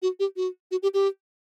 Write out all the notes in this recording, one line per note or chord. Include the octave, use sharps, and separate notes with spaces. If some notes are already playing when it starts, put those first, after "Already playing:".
F#4
G4
F#4
F#4
G4
G4